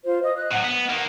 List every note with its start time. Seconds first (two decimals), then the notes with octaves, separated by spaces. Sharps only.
0.05 F4 C5
0.23 D#5 D#6
0.36 D#5 F#6
0.52 A2 F#3 F#5
0.64 B3
0.89 D#3 A#3